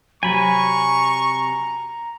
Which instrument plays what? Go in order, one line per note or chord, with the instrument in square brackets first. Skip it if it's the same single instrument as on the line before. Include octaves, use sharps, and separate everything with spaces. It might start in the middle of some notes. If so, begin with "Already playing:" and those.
[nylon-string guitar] C3 F#3 [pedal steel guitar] G#5 B5 [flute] A#5 [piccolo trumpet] C#6